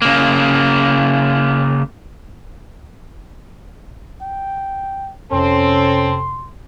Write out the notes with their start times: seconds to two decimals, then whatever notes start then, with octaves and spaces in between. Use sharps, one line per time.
0.02 C#3 A#3
4.21 G5
5.32 F2 C3 C4 C#4 A4 C6